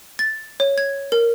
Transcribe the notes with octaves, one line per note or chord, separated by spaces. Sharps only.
A6
C#5
G#6
A#4